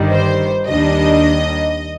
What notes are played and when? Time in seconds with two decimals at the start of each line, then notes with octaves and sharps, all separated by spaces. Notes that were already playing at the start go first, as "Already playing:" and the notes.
Already playing: G1 G2 D#3 G3
0.12 C5
0.68 D#2 D#3 G3 D4 D#5